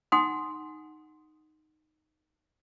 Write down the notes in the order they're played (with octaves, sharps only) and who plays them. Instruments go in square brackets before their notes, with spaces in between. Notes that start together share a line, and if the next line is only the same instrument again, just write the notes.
[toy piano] D#4 F#5 G#5 C6 D#6